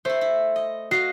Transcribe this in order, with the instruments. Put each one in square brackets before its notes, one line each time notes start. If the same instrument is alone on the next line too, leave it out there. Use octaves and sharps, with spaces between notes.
[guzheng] A3 E4 [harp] C5
[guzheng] E4
D#5
[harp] F#4 C7 [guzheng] D#5 F5